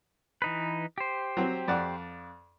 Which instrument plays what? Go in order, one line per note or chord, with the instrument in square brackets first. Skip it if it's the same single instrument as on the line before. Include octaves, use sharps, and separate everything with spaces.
[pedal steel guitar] E3 D#4 B4
G4 C5
[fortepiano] F#3 C4
F2 D5 F#5